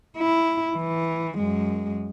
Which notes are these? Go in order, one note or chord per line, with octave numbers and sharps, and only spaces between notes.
E4
E3
F#2 G#3